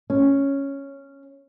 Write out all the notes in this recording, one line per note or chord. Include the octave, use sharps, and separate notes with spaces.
C#4